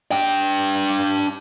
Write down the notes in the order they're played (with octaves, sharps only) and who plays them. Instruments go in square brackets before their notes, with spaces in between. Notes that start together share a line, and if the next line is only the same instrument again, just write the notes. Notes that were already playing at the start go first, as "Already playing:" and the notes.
[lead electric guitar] D4 G5